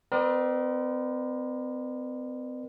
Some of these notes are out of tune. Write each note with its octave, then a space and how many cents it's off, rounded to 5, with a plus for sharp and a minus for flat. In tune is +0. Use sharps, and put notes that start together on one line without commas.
C4 -40 A#4 +35 D5 +40